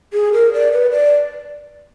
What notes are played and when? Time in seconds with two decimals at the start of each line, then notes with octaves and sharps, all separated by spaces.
0.13 G#4
0.33 A#4
0.53 D5
0.72 B4
0.91 D5